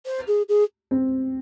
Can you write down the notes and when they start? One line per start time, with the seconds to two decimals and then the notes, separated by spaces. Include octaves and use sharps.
0.06 C5
0.27 G#4
0.49 G#4
0.91 C4